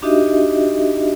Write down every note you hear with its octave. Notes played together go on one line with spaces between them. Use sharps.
D4 D#4 F#4 G4 D#5 E5